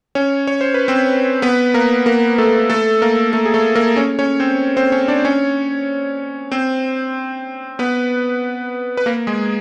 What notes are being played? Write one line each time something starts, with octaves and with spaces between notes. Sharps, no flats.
C#4 C#5
C#5
C5
B4
C4 C5
B3 B4
A#3 A#4
A#3 A#4
A3 A4
A3 A4
A#3 A#4
A3 A4
G#4
A3 A4
A#3 A#4
C#4 C#5
C#4 C#5
C4 C5
C4 C5
C#4 C#5
D4 D5
C#4 C#5
C4 C5
B3 B4
B4
A#3 A#4
G#3 G#4